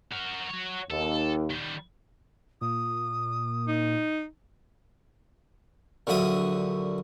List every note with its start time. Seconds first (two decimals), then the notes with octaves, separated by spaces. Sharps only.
0.11 F#4 A#4
0.50 F#4 C#5
0.90 D#2 A4
1.50 D#3 G3
2.61 A#2 D#6
3.68 D#4
6.07 A#1 D3 F#3 E5 D#6